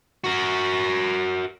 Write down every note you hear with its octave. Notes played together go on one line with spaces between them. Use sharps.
F#4 A#4